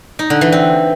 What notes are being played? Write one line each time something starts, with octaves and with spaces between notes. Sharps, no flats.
D#4
D3
E3
C4